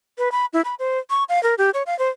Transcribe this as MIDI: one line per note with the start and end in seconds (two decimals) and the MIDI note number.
0.18 0.31 71
0.32 0.46 83
0.53 0.61 64
0.65 0.75 83
0.79 0.99 72
1.10 1.24 85
1.29 1.42 77
1.43 1.55 70
1.58 1.70 67
1.74 1.83 73
1.86 1.97 77
1.99 2.09 72